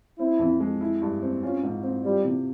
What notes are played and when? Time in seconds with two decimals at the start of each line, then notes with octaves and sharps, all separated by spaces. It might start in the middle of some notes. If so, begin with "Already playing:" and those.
0.19 C4 E4
0.39 F2
0.60 G#3
0.81 E4
1.02 G2
1.22 C4
1.42 C#4 F4
1.63 G#2
1.83 C4
2.04 G3 F4
2.25 C3